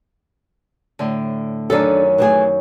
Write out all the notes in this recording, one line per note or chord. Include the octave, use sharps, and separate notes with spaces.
A2 D3
F#2 D#3 D4 A4
E3 A3 G#4